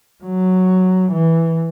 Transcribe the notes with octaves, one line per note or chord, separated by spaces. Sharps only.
F#3
E3